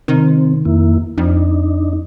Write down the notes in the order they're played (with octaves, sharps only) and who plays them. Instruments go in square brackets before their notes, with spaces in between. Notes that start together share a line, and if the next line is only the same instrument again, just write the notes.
[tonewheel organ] C3 C4 [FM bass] D#3
[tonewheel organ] F2 A#3 E4
[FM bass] F2 [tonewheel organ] D4 D#4